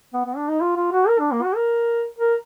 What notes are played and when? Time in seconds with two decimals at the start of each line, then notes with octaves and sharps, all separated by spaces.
0.14 B3
0.26 B3
0.37 D4
0.49 D#4
0.61 F4
0.76 F4
0.92 F#4
1.08 A#4
1.19 D4
1.32 A#3
1.43 F#4
1.56 A#4
2.18 A#4